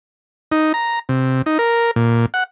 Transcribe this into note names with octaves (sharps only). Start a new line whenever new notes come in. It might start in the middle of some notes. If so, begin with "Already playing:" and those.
D#4
A#5
C3
D#4
A#4
A#2
F#5